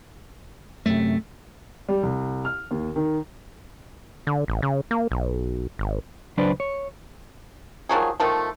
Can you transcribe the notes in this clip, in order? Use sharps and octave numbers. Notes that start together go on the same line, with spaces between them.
F#2 C3 A3
G3
C2
F6
D#2
D#3
D3
A1
C#3
A#3
B1
G#1
C#2 F#3 D4 B4 C5 D5
C#5
D#3 F3 F#3 G#4
D#3 F3 A3